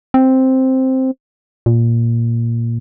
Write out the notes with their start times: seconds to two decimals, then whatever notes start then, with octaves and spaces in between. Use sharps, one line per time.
0.14 C4
1.66 A#2